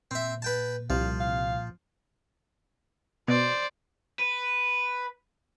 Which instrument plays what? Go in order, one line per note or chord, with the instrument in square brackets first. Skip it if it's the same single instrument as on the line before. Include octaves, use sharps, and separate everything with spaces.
[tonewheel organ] A#2 [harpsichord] C4 E5
[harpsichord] B4 G5 A5
[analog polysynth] C2 [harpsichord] F3 [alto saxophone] F5
[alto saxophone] F5
[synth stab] B2 [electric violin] C5 D5
[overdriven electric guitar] B4